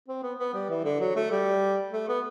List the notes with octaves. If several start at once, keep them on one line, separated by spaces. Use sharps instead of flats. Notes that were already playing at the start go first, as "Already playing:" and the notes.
C4
B3
B3
G3
E3
D3
F#3
A3
G3
A3
B3